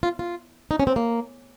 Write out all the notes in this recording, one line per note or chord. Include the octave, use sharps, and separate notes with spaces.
F4
F4
D#4
C#4
C4
A#3